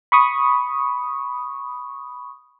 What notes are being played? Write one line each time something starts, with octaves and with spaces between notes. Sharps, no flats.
B5 C#6 D#6